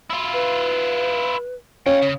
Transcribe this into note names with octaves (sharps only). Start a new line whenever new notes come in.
E4 F4
B4
C#4 F5 G5
C#3